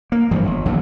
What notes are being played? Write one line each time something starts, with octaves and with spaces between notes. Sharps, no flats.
A#3
F1 G2 E3 F3
G1
A#1 D#2 E3 F#3